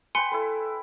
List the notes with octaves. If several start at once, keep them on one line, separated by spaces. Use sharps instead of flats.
B4 G5 G#5 C6 C#7
E4 A4 B4